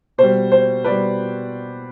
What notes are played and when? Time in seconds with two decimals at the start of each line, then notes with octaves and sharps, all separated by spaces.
0.18 B2 G3 C5
0.52 C5
0.84 B2 G3 B4 D5